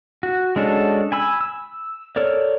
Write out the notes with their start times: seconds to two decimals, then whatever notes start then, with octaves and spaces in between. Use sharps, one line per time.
0.23 F#4
0.56 G#3 C#4 D4 F#4 A4
1.12 G#5 B5 E6
1.41 E6
2.16 A4 A#4 C#5 D5